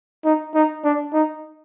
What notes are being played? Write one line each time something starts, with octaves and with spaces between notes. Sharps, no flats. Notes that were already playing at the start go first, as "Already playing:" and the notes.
D#4
D#4
D4
D#4